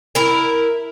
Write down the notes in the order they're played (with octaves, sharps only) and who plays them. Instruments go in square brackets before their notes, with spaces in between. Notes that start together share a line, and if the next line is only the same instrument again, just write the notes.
[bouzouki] E4 A#4